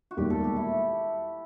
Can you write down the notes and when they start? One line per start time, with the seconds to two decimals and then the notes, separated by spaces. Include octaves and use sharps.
0.11 F#4
0.17 E1 D#2 D#3 G3 G4
0.30 A4
0.44 G4
0.56 E4